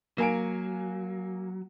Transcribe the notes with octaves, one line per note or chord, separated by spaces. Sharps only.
F#3 A#3 G#5 D7